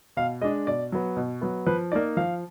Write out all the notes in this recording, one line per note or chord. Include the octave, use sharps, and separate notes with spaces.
B2 F5
G#3 D4 D#5
B2 D5
F#3 B3
B2
F#3 B3
F3 B4
A#3 D#4 D5
F3 F5